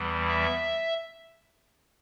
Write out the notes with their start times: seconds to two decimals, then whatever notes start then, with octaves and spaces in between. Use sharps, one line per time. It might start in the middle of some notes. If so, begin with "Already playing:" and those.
Already playing: E2 E3 G3
0.29 E5